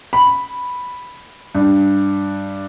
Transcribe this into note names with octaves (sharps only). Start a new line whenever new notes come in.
B5
G2